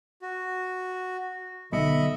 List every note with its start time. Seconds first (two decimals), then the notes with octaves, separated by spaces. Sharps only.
0.22 F#4
1.73 B1 D3 D#5 E5 B5 C#7